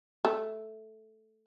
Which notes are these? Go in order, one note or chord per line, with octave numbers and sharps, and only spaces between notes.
A3